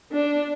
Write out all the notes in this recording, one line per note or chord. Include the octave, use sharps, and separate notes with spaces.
D4